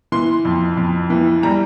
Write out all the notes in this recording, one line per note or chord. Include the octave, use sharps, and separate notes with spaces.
E3 C6
F2
F2
E3
G3 A#5